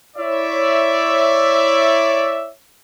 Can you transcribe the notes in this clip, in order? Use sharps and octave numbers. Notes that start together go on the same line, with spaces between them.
E4 C#5 D5 E5